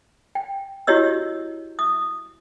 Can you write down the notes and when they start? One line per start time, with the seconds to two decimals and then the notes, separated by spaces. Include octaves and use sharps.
0.35 G5
0.87 E4 F#4 G4 C#5 D#5 E6
1.79 D#6